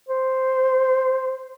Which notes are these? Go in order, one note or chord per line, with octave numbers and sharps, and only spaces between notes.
C5